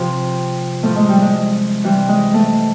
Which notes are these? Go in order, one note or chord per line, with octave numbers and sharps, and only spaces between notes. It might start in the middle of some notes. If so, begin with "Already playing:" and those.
Already playing: C3 F3
A2 F3 A3
G#3
G3
G#3
C3 E3 G3
G#3
A3